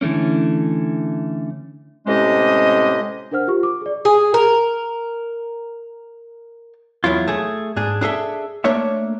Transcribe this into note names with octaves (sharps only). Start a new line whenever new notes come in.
D3 E3 A3 A#3 C#4
A2 C3 G#3 C#4 G4 D#5
D4 A#4 C5 F#5 F6
F4 G4 C#6
D6
G#4 D5
G#4
A#4
E2 F#3 E4 F4
A3 G#4
G#2 D4 G#4
D4 G#4 A4 E5
A3 A#3 D4 C#5 E5